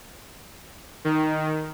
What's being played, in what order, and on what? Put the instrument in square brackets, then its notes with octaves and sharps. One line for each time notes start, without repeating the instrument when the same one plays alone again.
[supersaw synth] D#3